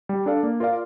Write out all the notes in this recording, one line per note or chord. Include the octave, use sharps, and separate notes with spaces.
G3
D4 A4 D5 F5
A#3
F4 A#4 D5 F5